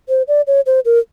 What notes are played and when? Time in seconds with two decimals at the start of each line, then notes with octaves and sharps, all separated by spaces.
0.09 C5
0.28 D5
0.47 C#5
0.66 C5
0.85 A#4